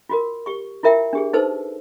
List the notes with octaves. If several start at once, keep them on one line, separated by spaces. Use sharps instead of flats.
F4 F#4 A#4
G4 C#6
E4 F4 A#4 E5 G5
D4 G4 G#4
D#4 A4 B4 C5 A5 E6